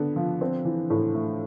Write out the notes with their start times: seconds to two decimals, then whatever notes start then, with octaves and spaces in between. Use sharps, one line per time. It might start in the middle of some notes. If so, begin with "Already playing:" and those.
Already playing: D3 B3
0.16 F3
0.41 C4
0.65 E3
0.90 A2
1.15 A3